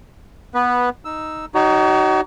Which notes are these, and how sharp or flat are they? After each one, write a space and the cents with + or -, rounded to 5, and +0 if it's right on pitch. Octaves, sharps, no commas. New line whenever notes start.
B3 -10 B4 -5
D#4 +0 E6 +0
D#4 +0 F#4 +40 C#5 +30